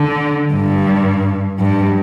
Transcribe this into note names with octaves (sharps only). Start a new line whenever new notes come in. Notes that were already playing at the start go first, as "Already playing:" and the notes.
Already playing: D3
G2
G2